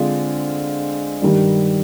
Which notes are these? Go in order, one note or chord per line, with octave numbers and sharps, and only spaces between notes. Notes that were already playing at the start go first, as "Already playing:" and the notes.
Already playing: D3 G#3 C4 F4
G2 D#3 G3